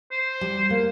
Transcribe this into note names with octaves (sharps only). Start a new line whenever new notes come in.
C5
G3
A#3